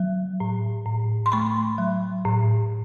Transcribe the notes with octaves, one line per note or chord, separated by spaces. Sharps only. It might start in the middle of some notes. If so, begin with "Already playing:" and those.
Already playing: F#3
A2
A2
C6
A3 B5 C#6
F#3
A2